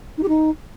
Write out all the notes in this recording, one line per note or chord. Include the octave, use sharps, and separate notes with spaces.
D#4
G4
D#4